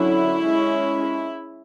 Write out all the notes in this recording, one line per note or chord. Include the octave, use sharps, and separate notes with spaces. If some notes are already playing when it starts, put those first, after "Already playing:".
Already playing: D3 F#3 C#4 E4
G#3 C#4